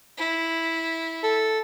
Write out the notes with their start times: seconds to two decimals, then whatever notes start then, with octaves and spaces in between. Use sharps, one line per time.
0.17 E4
1.24 A4